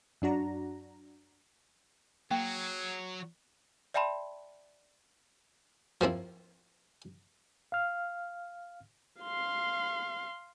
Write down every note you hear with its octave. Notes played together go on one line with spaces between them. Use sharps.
F#2 D4 F#4 A#5
F#3 A#3 G#4 G5
D5 E5 G5 A5 B5 C6
F3 A#3 C4 E4
F5 F6
F5 C6